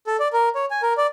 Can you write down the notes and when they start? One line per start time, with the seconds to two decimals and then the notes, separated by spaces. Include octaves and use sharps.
0.07 A4
0.20 D5
0.33 A#4
0.55 C#5
0.71 G#5
0.83 A#4
0.98 D5